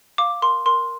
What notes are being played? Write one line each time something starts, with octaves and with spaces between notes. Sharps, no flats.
F5 D6
A#4 C6
A#4 C6